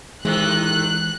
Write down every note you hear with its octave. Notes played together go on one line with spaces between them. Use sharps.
A2 C3 D#3 E3 G#3 F#6